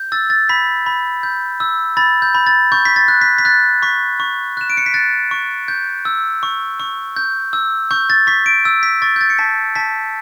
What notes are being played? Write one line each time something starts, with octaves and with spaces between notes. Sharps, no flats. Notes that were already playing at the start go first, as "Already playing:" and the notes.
Already playing: G6
E6 A6
A6
B5 B6
B5
G6
E6
B5 A6
G6
B5
A6
C#6 G6
B6
A6
F#6
B6
B6
F#6 A6
C#6 B6
C#6
F#6 E7
D7
C#7
B6
F#6 A6
C#6
G6
E6
C#6
C#6
G6
E6
C#6 G6
A6
C#6 B6
D7
E6
B6
C#6 A6
G6
A6
C#7
A5 B6
A5 B6